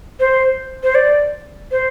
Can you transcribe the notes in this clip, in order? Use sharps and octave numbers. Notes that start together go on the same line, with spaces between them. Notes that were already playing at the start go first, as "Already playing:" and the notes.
C5
C5
D5
C5